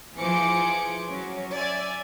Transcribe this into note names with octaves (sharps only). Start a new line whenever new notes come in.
E3 F3 G#4 C5 D6 C#7
F#3 C#4
D5 E5 G#5